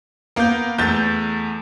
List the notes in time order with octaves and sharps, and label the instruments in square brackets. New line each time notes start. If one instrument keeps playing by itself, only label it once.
[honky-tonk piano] A#3 A#4 [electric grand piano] B3 G6
[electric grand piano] E2 A3 [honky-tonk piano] G6 A6